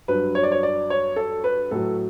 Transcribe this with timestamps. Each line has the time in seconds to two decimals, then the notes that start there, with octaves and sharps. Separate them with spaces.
0.08 G2 F#3 B4
0.35 C#5
0.43 D5
0.52 C#5
0.63 D5
0.90 C#5
1.16 A4
1.44 B4
1.71 A2 F#3 A4